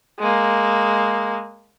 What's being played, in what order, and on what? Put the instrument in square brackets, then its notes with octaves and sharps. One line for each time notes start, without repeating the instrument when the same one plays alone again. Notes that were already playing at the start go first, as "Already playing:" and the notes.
[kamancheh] G#3 A#3